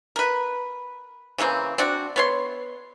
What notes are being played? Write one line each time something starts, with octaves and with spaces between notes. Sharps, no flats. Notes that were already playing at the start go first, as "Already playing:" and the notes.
A#4 B4
C#3 E3 A#3 C4
C4 D4 F#4
B3 C#5 C6